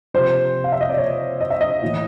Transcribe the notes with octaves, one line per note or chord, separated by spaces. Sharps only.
C3 F3 C5
F5
E5
D#5
D5
C#5
D#5
E5
D#5
A2 E3